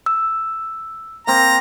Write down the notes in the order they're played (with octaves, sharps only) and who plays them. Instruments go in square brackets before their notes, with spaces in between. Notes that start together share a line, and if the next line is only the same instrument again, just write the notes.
[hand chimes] E6
[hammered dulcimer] A#3 C4 [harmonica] A#5